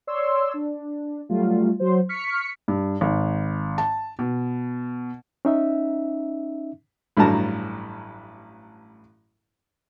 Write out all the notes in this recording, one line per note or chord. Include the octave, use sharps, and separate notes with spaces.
C#5 D5 C6 E6
D4
F#3 G3 A3 F4
F#3 C5
C#6 F6 B6 C#7
G2
G#1
A5
B2
C#4 D#4 E5
A1 G2 E3 F#3 A5 A#5